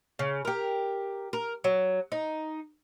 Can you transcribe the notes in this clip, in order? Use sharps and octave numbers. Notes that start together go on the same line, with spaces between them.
C#3
G4 A#4
A#4
F#3
D#4